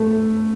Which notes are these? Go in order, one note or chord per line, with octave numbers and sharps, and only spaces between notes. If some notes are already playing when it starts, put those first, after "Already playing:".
Already playing: A3